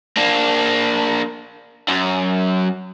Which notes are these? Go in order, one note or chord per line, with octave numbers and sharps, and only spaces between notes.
A#3 D4
F#2